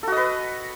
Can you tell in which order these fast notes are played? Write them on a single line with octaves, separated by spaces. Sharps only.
A4 F#4 D#5 B4